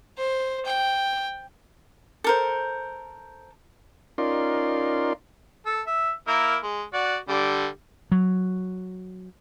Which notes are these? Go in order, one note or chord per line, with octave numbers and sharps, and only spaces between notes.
C5
G5
A4 A#4 C5
C#4 D#4 F4 A#4 D5 C6
A4 E6
E5
A#3 E4 A#4
G#3
F#4 D5
D3 G3
F#3